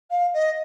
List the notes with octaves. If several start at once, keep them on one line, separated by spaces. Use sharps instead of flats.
F5
D#5